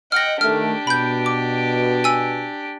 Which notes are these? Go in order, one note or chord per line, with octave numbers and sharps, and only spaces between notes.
D#5 F#5 G5 F6 A#6
D#3 A3 D4 G4 F6
B2 B5 G6
D6
G#5 E6